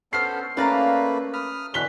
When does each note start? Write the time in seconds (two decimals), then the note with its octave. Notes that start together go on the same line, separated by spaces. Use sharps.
0.13 B3 C#4 A4 C5 F6 C7
0.57 A3 A#3 C#4 B4 D5 F5 A#5
1.34 B5 D#6 F6
1.74 B2 D3 E3 C#5 F#6 B6 G7